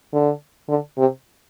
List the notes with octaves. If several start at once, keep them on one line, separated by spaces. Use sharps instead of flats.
D3
D3
C3